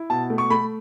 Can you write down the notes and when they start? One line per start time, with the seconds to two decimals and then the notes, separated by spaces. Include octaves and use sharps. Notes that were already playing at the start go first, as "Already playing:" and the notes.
Already playing: E4
0.10 B2 A5
0.30 A3
0.38 C#6
0.50 A3 B5